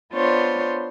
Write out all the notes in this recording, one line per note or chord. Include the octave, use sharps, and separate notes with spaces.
B3 D4 F4 C5 C#5